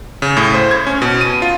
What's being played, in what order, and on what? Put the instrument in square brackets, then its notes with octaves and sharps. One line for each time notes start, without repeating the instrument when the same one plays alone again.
[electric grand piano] C#3
A2
C5
G#6
C#4
B2
D#7
F4